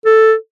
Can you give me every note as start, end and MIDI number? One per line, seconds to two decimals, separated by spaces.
0.05 0.34 69